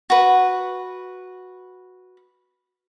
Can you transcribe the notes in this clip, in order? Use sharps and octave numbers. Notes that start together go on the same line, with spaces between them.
F#4 B4